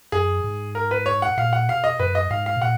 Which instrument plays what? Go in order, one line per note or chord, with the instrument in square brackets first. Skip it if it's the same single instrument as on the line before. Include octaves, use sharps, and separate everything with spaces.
[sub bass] F#2 [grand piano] G#4
[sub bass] G#2
[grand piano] A#4
B4
C#5
F#5
[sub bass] A#2 [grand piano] F5
[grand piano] F#5
[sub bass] B2 [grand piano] F5
[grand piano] D#5
[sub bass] F#2 [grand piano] B4
[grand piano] D#5
[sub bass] G#2 [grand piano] F5
[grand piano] F5
[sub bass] B2
[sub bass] A#2 [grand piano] F#5